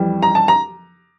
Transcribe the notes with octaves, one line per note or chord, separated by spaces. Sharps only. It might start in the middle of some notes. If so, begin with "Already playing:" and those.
Already playing: F2 E3 G3
A#5
A5
A#5